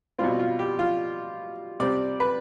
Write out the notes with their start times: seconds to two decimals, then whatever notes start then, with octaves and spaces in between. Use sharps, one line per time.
0.18 B2 G3 C4 F4
0.39 F4
0.59 G4
0.79 F4
1.80 C3 G3 C4 D5
2.20 B4